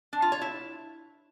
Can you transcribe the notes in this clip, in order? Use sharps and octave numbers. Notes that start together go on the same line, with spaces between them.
D4
F4
C#5
E4